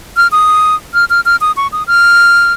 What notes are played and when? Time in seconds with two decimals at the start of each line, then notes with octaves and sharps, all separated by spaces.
0.17 F6
0.32 D#6
0.94 F6
1.10 F6
1.25 F6
1.41 D#6
1.57 C#6
1.72 D#6
1.87 F6